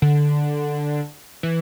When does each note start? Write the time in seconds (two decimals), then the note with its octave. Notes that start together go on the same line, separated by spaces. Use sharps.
0.02 D3
1.43 E3